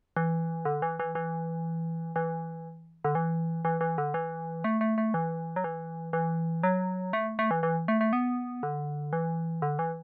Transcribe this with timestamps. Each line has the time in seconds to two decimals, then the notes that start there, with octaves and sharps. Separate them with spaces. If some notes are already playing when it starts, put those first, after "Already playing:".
0.16 E3
0.65 D3
0.82 E3
1.00 E3
1.15 E3
2.16 E3
3.04 D3
3.15 E3
3.65 E3
3.81 E3
3.98 D3
4.14 E3
4.64 A3
4.81 A3
4.98 A3
5.14 E3
5.56 F#3
5.64 E3
6.13 E3
6.63 F#3
7.13 A3
7.39 A3
7.51 E3
7.63 E3
7.88 A3
8.01 A3
8.13 B3
8.63 D3
9.13 E3
9.62 D3
9.79 E3